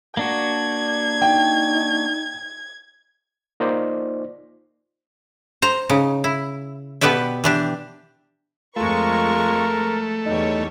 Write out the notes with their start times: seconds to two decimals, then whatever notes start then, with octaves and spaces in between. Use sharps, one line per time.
0.17 A#3 D4 F#4 G#6
1.22 D#4 G5
3.60 A#3 D#4 F4 C5 D5
5.62 C5 A#5
5.89 C#3 D#4
6.24 E4
7.01 B2 B3 G4 B4 D5 E5
7.44 E3 D4 G4
8.76 F2 G#3 A3 F4 A#4 C#6
10.26 E2 G3 D#4 C#5